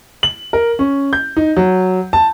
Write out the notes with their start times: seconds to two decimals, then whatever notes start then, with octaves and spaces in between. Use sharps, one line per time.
0.23 F#7
0.53 A#4
0.79 C#4
1.13 G6
1.37 D#4
1.57 F#3
2.13 A5